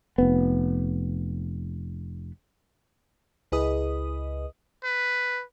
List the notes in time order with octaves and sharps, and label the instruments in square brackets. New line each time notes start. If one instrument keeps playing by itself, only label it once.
[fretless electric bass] F1 B3
[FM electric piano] C#2 E4 G#4 B4 D#5 D#6
[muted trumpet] B4